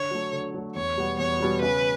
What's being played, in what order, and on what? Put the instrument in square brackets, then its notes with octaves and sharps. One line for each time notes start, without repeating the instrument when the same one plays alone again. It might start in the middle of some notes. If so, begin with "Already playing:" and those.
Already playing: [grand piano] D3 [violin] C#5
[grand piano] F#3 A3
D3
F#3 A3
[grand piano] E2 [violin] C#5
[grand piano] B2 G3 B3 F#4
[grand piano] E2 [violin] C#5
[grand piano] B2 G3 B3 F#4
[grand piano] C#3 [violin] B4